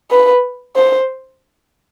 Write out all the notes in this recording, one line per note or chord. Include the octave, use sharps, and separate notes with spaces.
B4
C5